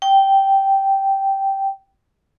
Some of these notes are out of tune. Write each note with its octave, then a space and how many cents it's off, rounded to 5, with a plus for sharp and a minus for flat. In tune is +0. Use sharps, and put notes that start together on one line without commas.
G5 -10